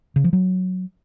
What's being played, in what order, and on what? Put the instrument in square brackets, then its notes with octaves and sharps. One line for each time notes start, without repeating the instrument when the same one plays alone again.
[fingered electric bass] C#3
F3
F#3